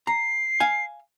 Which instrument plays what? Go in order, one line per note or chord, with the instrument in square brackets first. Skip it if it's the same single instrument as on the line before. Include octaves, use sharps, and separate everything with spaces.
[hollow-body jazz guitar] A#5 [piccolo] C7
[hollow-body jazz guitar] F5 G#5